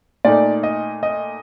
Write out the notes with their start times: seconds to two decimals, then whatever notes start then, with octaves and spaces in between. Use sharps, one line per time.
0.25 A#2 A3 D#4 D5
0.63 D#5
1.03 D#5